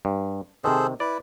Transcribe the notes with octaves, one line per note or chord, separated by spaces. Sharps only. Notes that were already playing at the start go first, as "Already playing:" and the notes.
G2
C3 D#3 G#4 A4 C5
E4 B4 D5